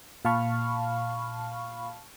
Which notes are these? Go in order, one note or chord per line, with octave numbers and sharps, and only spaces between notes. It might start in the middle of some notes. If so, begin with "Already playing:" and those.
A#2 F5 A5 B5 C#6 F6